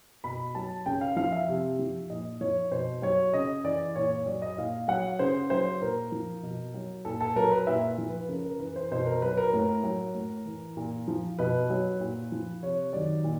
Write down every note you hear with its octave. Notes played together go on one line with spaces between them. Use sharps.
B2 B5
F#3 A5
C#3 G5
F5
F3 F5
E5
C3
F3
A#2 D#5
F3 C#5
B2 C5
F#3 C#5
C#3 D#5
E3 D5
A#2 C#5
C#5
F#3 D5
D#5
A#2 F5
F#3 F#5
C#3 C5
F#3 C5
A#2 A#4
F3
B2
F#3
A#2 A4
A4
F#3 A#4
B4
A#2 E5
F3
B4
C#3 A#4
A#4
E3 B4
C5
B2 C5
A#4
F#3 B4
A#4
A2 A#4
F#3
A2
E3
A#2
F3
B2 B4
F#3
A#2
F3
C3 C#5
D#3 F#3 D5
A#2